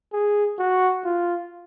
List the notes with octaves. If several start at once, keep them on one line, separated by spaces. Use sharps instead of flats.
G#4
F#4
F4